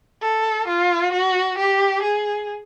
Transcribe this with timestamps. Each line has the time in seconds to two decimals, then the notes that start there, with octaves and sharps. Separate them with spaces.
0.22 A4
0.68 F4
1.12 F#4
1.58 G4
2.03 G#4